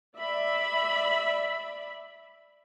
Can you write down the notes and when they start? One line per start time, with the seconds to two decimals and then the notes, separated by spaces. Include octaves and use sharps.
0.16 D5 E5 B5